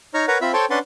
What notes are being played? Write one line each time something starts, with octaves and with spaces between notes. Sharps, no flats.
D#4 C#5 A#5 F6
A#4 B4 C#5 F#5 A#5
C4 F4 E5 B5
A4 C5 C#5 G5 A5 C6
C#4 D4 B4 F#5 A5 C6